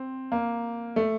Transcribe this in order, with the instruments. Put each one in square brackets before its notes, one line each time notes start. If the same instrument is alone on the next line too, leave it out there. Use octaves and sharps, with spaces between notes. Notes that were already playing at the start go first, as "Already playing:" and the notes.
Already playing: [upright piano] C4
A#3
A3